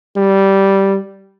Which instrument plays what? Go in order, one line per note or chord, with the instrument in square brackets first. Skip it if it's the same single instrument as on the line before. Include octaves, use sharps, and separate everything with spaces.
[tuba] G3